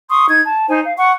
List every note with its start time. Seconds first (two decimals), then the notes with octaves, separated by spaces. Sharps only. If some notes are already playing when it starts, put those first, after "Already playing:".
0.09 C6 C#6 D#6
0.29 D#4 G#6
0.45 A5
0.69 D#4 C5 G#5
0.85 F5
0.97 F#5 C#6